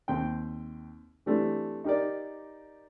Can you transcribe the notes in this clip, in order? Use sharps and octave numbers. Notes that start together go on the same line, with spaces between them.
D#2 C4 G5
E3 G3 A3 C4 D4
D#4 G4 A#4 D5